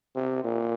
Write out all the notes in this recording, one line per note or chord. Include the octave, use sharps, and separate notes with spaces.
C3
A#2